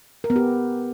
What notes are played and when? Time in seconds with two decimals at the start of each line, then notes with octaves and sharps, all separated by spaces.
0.24 A#4
0.30 B3
0.36 G4